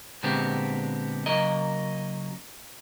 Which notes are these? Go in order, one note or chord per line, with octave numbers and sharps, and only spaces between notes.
A#2 D3 G#3 B3 C4 G4
C#3 F#3 A#3 A#4 D#5